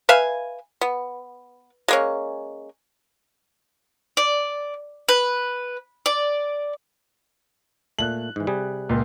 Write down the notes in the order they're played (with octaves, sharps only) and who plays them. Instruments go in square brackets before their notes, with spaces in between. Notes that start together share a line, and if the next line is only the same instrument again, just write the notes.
[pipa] B4 E5 F5 G#5
B3
G#3 A#3 C#4
[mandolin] D5
B4
D5
[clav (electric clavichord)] A#2 A3 [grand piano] F#6 F#7
[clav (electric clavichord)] G#2 E3
C3 G3 G#4
[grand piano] C#2 A#2